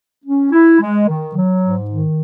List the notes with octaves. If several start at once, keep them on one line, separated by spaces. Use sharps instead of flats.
C#4
E4
G#3
D#3
F#3
G#2
D#3